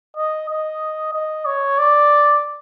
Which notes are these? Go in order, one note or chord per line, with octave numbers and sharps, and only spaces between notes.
D#5
D#5
D#5
C#5
D5